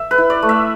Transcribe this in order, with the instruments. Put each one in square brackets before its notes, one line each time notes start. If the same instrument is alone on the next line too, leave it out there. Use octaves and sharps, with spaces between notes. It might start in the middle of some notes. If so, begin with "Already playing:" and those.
Already playing: [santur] E5
B4
E4
D5
A3
E5